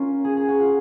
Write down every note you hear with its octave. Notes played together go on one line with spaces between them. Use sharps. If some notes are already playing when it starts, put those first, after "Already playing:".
Already playing: A#3 C#4 F4
G#4
G#4
F#4
F4